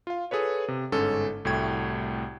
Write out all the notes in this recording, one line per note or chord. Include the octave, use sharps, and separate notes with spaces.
F4 F5
G#4 A4 B4 C#5
C3
G1 G#2 C#4 A4
C2 A2 A3 F#4 G5 G#6